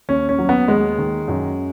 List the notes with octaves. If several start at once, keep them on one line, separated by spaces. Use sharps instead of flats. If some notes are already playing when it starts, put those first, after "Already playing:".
D#2 C#4
C#4
F#3
B3
D#2 G#3
D#3
F#2